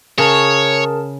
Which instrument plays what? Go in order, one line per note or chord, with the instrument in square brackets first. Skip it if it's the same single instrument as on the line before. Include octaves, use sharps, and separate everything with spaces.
[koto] C#3 [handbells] G#4 A#4 A5 [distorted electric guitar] C#5